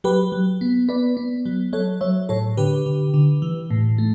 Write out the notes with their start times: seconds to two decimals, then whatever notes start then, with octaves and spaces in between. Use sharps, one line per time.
0.04 F#3 G4 B4
0.32 F#3
0.61 B3
0.89 B3 B4 D5
1.17 B3
1.46 F#3
1.73 F#3 A4 C#5
2.01 F#3 C#5 E5
2.29 A2 A4 C#5
2.57 D3 G4 B4
2.86 D3
3.14 D3
3.42 E3
3.70 A2
3.98 A3